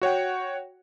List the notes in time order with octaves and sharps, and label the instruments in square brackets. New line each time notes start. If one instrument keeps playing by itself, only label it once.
[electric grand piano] F#4 C#5 F#5 G5